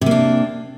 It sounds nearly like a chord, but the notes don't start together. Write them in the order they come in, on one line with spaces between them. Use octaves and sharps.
C3 A#3 D4